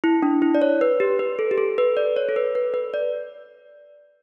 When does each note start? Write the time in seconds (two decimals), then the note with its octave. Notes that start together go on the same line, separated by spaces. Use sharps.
0.04 E4
0.22 D4
0.42 E4
0.55 D5
0.62 C#5
0.81 B4
1.00 G4
1.19 B4
1.39 A4
1.51 G4
1.58 A4
1.78 B4
1.97 D5
2.16 C#5
2.29 A4
2.36 B4
2.55 B4
2.74 B4
2.94 D5